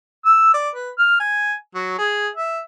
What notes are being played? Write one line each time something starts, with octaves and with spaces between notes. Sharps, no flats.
E6
D5
B4
F6
G#5
F#3
G#4
E5